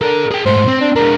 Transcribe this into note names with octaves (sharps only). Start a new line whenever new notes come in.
A4 A#4 D5
G#4 G5
G#2 A3 C5
C4
D4
G#3 D4 A#4